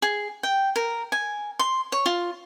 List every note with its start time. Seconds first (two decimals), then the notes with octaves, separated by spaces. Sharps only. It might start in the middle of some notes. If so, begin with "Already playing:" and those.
0.02 G#4
0.43 G5
0.76 A#4
1.12 G#5
1.59 C6
1.92 C#5
2.06 F4